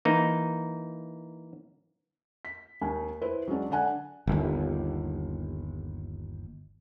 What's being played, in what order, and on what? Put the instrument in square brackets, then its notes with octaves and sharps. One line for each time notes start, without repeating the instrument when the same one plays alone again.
[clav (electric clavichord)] E3 A#3 D#4
[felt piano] B6
D#2 G#5
E4 B4 C5
F#3 G#3 C#4 D4
D3 D4 F#5 G#5 F#6
[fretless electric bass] G1 D#2